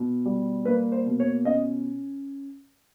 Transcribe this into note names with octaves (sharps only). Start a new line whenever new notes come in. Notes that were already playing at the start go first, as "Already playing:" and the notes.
Already playing: B2
G3
A#3 B4
C5
B2
C#5
C#4 D#5